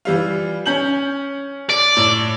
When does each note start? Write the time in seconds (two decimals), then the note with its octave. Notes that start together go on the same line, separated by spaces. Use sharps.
0.05 E3 G3 F4
0.66 C#4 G6 F#7
1.69 D5
1.97 A2